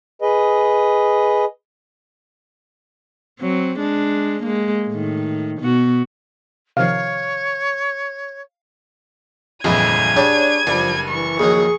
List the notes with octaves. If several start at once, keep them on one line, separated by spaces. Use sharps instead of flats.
G#4 B4 D#5
F#3 C4
G#3 D4
G#3 A#3
A2 D#3
B2 B3 F#4
C3 D#3 F3 C#5 F5
G1 F2 A#2 E3 G#3 G#6 D#7
C#3 D4 G4 C#5 A5
F#1 G2 F3 D5
E3 C#6
A#1 D#3 F#3 G#4